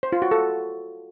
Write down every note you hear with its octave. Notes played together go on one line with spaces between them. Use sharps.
C5
F4
F#4
A4